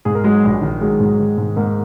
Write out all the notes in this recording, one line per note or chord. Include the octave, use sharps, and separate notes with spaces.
G#2 G#4
A#4
F#3 G#3 G#4
A#1
D#3
F#3 G#3 G#4
G#2
D#3
G#2
G#2 A#3 A#4